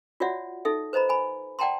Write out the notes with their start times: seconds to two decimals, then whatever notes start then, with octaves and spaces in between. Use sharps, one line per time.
0.20 F4 F#4 C#5 D5 E5 F#5
0.65 D#4 A4 E5
0.93 B4 C5 D#5 A#5 B5
1.09 G#5 B5
1.59 D5 F#5 G5 A5 A#5 C6